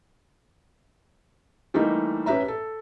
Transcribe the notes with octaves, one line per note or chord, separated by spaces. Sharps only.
E3 G3 A3 A#3 D#4
C#4 G4 B4 E5 A#5
A4